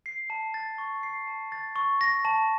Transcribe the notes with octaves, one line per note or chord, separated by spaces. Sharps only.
C7
A5
A6
C#6
C7
A5
A6
C#6
A#6
A5